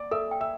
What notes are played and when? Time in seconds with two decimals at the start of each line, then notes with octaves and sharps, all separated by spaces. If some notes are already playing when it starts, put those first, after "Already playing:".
Already playing: D5 D6
0.11 A4 E5 E6
0.31 G5
0.41 E5 E6